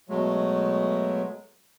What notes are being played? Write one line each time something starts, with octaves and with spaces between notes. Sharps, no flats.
B2 F#3 G#3 A3